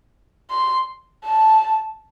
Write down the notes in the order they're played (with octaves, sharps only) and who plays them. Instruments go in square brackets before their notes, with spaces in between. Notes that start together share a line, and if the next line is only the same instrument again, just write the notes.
[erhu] C6
A5